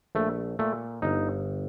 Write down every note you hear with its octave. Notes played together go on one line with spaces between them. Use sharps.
A#1 A3
A#2 A3
G1 D#4